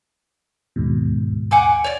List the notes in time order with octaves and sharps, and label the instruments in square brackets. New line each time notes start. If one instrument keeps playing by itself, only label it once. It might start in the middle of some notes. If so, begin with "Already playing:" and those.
[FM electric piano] D#2 G#2 B2
[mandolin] F#5 G#5 D6
C#5 D5